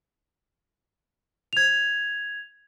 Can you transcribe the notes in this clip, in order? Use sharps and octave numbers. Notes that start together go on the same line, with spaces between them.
G#6 F7